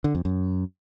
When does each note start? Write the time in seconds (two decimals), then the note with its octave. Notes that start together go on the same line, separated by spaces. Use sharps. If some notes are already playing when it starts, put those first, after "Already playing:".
0.04 D3
0.15 F2
0.25 F#2